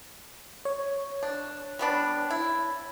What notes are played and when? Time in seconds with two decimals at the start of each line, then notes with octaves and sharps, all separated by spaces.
0.65 C#5
1.23 D4
1.79 G3 B3 D4
2.30 E4